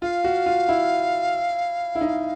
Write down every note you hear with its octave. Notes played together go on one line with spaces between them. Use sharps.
F4 F5
F#4
F4
E4
E4
D#4